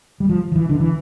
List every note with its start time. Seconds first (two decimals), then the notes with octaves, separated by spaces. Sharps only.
0.20 G3
0.29 F3
0.52 F3
0.56 E3
0.69 D3
0.80 E3